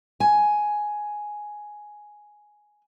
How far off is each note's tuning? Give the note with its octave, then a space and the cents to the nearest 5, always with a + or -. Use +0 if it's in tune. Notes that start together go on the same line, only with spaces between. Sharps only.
G#5 +5